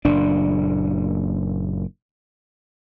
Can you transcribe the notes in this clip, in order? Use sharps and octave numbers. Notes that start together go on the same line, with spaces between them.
F#1 A#2 D4